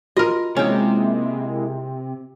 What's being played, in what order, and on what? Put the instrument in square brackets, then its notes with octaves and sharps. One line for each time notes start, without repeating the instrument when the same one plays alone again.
[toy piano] F4 F#4 [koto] A#4 D#5
[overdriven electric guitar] C3 [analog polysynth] G#3 A#3 E4 [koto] C#4 G5